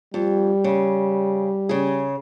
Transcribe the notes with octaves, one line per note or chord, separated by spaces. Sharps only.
F2 G3
C#3
C#3 G#4